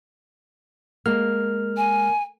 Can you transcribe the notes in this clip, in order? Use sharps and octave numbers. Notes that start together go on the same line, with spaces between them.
G#3 A#3 F6
G#5